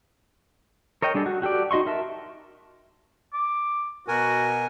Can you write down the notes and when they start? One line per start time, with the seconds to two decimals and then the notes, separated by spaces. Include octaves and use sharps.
1.02 A#4 C#5 D#5 G5
1.14 G3 D4 G#4 A4
1.26 F#4
1.42 F#4 G4 A4 D5
1.71 D#4 F#4 D#5 C6 C#6
1.87 A#4 E5 A5
3.34 D6
4.08 B2 F#4 A#4 G#5